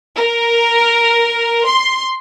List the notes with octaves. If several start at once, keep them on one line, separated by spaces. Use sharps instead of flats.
A#4
C6